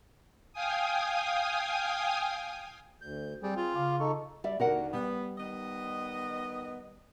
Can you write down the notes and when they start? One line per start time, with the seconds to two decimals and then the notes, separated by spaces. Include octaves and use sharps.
0.53 F5 G5 G#5 D#6
3.01 D2 G6
3.43 G3 C4 G#4
3.56 F4
3.75 C#3 F5 D6
4.00 D#4 A4 C#6
4.44 G3 D5 E5
4.60 D#2 D3 F#4 A#4 F#5
4.93 G3 B3
5.38 D#3 B3 D#5